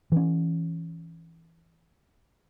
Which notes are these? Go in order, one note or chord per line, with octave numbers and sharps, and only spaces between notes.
E3 C#4